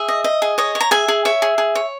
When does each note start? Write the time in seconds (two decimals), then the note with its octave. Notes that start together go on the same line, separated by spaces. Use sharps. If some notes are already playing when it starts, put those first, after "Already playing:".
Already playing: G#4 E5
0.08 D#5
0.24 D#5
0.42 G#4
0.58 C#5 D#5
0.75 C#5
0.81 A#5
0.91 G#4 E5 G#5
1.08 G#4
1.25 C#5 E5
1.42 G#4
1.58 G#4
1.75 C#5